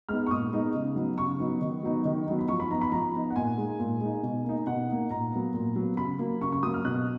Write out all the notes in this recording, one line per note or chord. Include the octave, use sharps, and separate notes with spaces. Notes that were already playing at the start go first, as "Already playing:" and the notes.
G#3 B3 D#4 F6
C#6
A#2 D#6
G#3 B3 D#4
C#3
F#3 B3 D#4
C#3 C#6
F#3 B3 D#4
D#3
F#3 B3 D#4
D#3
F#3 B3 D#4
B5
F3 C#6
B5
B3 D#4 A#5
B5
F3 A#5
B3 D#4
F#5
A#2 G#5
G#3 D#4
A#2
G#3 D#4
B2
A#3 D#4
B2 F#5
A#3 D#4
A#2 A#5
F#3 B3
A#2
F#3 B3
C#3 B5
F#3 A#3
C#3 C#6
C#6
F#3 A#3 D#6
F6
B2 F#6